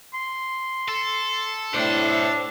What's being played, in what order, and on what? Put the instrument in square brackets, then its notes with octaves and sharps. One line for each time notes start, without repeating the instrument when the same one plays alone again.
[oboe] C6
[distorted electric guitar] A4
[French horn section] A2 [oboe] D4 [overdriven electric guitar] C5 D5